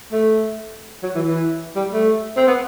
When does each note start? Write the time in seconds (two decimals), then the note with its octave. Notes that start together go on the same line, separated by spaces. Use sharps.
0.12 A3
1.03 F#3
1.15 E3
1.27 E3
1.76 G3
1.93 A3
2.37 C4
2.48 B3